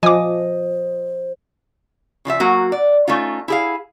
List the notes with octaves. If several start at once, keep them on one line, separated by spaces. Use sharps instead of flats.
F3 C5 D#5 G#5 D6
C#3 F3 D#4 E5
F#3 A#3 F#4
D5
A3 C#4 D#4 F4
E4 G#4 F5